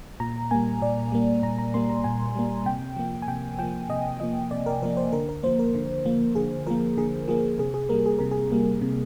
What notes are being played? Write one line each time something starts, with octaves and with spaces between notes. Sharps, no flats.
A#2 A#5
G3 A#3 G#5
A#2 D5
G3 A#3
A#2 A#5
A#5
G3 A#3 C6
A#5
A#2 G#5
G3 A#3
C3 G5
F3 A#3
G#5
C3 G5
F3 A#3 G5
C3 D#5
F3 A#3 D#5
C3 D5
A#4
F3 A#3 A#4
C5
D3 A#4
A#4
F3 A#3 C5
A#4
D3
F3 A#3
D3 G#4
F3 A#3 A#4
D3 G#4
F3 A#3 G#4
C3 G#4
G#4
G3 A#3 A#4
G#4
C3 A#4
G#4
G3 A#3
C3